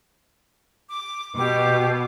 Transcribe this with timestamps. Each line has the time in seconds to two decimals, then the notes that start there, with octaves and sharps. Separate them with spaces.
0.89 D6
1.37 B2 G4 D6